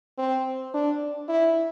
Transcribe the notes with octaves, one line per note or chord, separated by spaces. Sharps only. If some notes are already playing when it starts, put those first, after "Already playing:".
C4
D4
E4